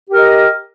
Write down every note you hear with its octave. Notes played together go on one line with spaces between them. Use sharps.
G4 A#4 D#5